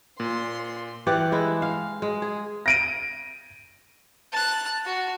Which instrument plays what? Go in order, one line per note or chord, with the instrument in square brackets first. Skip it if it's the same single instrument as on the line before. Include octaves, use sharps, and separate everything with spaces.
[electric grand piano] A#2 [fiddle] C6
[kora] E3 G4 D5 F#5
G#3 E4
F5
G#3
G#4
[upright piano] A#6 D7 D#7
[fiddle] A5 F#6
F#4